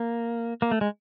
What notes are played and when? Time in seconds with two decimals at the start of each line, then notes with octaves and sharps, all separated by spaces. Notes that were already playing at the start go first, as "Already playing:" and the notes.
Already playing: A#3
0.62 A#3
0.71 A3
0.81 G#3